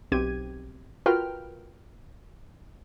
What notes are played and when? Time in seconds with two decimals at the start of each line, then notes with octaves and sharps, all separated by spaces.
0.12 B1 C4 G4 G#6 D#7
1.06 F4 F#4 A#4 B4 G5 F6